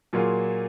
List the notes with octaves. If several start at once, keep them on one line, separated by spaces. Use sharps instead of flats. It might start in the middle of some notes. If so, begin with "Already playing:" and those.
A#2 F#3 A#3 F4 G#4